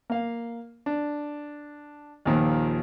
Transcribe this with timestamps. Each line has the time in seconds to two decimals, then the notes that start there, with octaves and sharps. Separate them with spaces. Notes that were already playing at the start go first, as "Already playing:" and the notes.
0.10 A#3 F5
0.86 D4
2.25 D#2 A#2 D#3 F3